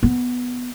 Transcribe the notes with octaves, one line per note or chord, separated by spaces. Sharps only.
B3